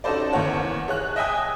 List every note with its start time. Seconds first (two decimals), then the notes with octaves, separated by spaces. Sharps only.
0.04 C#4 D#4 F#4 A4 C5 D5
0.33 E2 C#3 A#4 C#5 F#5
0.88 G#4 C#5 F#6
1.16 D#5 E5 G5 G#5 D#6